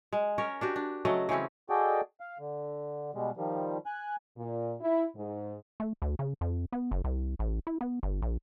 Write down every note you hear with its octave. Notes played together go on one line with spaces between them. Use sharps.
G#3
C#4 A#4 C#5
D4 F#4 G4
D4
C#3 F#3 A3 D#5
C#3 E3 C4 C#4
F#4 G#4 A4 D5 D#5 G5
F5
D3
B2 G3 G#3
D#3 F3 G3
G#5 F#6
A#2
E4
G#2
A3
D2
C#3
F2
B3
F#1
C2
A1
E4
B3
G1
A#1